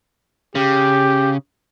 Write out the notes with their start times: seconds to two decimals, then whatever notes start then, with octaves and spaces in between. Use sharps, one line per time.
0.55 C#3 G4